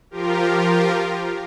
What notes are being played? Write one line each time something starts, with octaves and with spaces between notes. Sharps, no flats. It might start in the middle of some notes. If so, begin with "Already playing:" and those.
F3 F4 G4 A#4